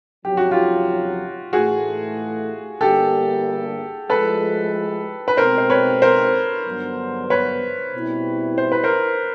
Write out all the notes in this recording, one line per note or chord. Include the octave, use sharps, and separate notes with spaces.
F2 C#3 F#3 G4
F#4
F4 G4
A2 E3 A3 F#4 G#4
G1 G2 D3 G3 A#3 G4 A4
A2 F3 G#3 A4 B4
B4
B2 G#3 C4 A#4 C5
C5
B4 C#5
A#4 C5
G2 D3 F#3 B3
B4 C#5
B2 G3 C4 E4
C5
B4
A#4 C5